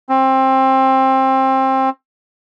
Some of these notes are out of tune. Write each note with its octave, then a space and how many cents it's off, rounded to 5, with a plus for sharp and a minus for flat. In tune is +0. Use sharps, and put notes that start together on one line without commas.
C4 +20